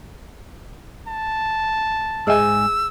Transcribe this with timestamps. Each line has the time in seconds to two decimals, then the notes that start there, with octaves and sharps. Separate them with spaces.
1.07 A5
2.27 G#2 G#4 D#5 E5 G#5 E6